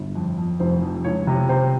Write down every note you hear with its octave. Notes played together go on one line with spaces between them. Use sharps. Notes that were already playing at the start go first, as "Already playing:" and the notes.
Already playing: G1
F2
F2
F1 C5
F2
C#2 C#5
C3
C3 C5